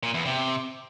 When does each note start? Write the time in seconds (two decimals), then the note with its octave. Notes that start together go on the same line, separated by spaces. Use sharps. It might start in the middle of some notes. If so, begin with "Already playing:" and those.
0.03 A#2
0.14 E2
0.25 C3